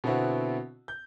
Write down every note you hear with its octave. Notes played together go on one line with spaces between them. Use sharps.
B2 D3 B3 C4 E4 F#4
G6